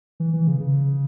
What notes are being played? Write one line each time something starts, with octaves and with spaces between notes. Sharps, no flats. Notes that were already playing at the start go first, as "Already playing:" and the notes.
E3
E3
C#3
C#3